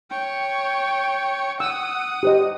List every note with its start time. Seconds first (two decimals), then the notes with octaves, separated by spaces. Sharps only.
0.10 C#5 G5
1.60 F#5 D#6 E6
2.23 G4 C5 D#5